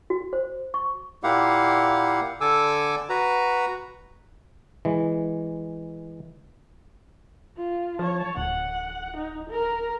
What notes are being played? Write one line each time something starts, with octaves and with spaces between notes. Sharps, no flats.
F#4
C5
C#6
A#2 A#3 E4 G4 F5 F#5
D3 A4 G#5 D6 E6
F#4 B4 A#5
E3 G#3
F4
F3 C#5 A5
D1 F#5
D#4
A#4